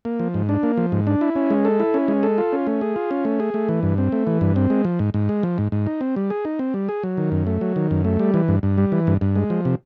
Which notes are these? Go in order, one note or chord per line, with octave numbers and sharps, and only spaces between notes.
A#3
F3
G#2
D4
A#3
F3
G#2
D4
E4
C#4
G#3
A4
E4
C#4
G#3
A4
F4
C#4
A3
G#4
F4
C#4
A3
G#4
A3
E3
G2
C4
A3
E3
G2
C4
G#3
F3
G#2
G#2
G#3
F3
G#2
G#2
D#4
C4
G3
G#4
D#4
C4
G3
G#4
F#3
D#3
F#2
A3
F#3
D#3
F#2
A3
G3
E3
G2
G2
G3
E3
G2
G2
G#3
F3
C3